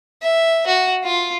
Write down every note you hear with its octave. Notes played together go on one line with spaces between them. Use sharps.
E5
F#4
F4